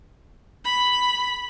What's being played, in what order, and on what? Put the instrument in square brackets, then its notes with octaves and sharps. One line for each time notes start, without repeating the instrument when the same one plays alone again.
[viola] B5